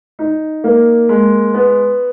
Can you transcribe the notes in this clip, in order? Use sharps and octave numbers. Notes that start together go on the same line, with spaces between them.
D#4
A#3
G#3
B3